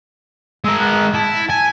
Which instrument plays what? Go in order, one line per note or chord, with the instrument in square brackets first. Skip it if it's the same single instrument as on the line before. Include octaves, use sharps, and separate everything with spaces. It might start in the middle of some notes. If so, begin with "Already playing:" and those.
[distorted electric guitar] G#3 A#4 [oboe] E6
[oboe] B3
[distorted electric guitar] E4 [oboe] A5
[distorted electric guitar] G#5